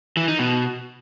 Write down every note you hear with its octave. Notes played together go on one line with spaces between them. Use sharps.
E3
D#4
B2